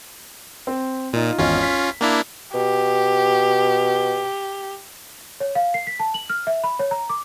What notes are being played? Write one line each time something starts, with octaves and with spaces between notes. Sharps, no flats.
C4
A#2 D#4 F4
G#1 E2 C#4 F4 D#5
B6
A#3 D4 E4 F5 F7
B2 G4
C#5
F5
C7
B6
A5
F#7
F6
E5
B5
C#5
A#5
D6